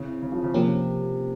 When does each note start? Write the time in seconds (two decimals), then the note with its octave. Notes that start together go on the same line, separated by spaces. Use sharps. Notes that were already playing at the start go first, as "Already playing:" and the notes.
Already playing: C#3 C4 E4
0.22 C#3
0.32 F3
0.44 C#3
0.54 C3 F3 A#3 C#4 G4